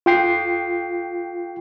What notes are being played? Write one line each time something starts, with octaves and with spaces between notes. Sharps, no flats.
F4 G5 C7